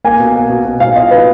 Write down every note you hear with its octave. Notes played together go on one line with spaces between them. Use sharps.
A#3 G#5
B2
A#3
B2
B2
B2 F5
F4 D#5
B2 B4